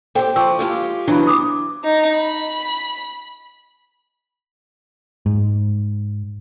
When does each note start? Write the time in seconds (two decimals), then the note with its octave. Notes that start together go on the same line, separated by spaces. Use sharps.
0.15 C4 G4 A4 G5
0.36 F3 C#6 D6 E6
0.59 G#3 F4 G4
1.08 B2 E3 F#3 D4 B5
1.27 D6 D#6
1.84 D#4
2.18 B5
5.26 G#2